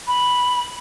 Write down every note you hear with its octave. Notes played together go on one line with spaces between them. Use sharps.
B5